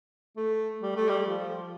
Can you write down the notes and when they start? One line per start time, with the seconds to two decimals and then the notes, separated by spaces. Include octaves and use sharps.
0.37 A3
0.82 G3
0.96 A3
1.09 G3
1.26 F3